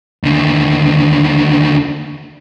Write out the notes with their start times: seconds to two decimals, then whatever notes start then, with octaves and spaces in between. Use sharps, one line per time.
0.23 D#2 D3